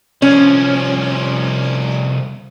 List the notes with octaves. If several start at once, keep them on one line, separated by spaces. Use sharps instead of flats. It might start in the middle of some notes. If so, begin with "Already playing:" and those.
C2 F3 C#4